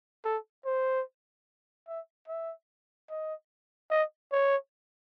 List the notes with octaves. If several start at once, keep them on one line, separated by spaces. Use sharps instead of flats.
A4
C5
E5
E5
D#5
D#5
C#5